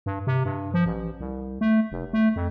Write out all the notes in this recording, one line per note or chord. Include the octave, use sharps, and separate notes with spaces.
G2
C3
G2
F3
A1
C2
A3
F1
A3
F2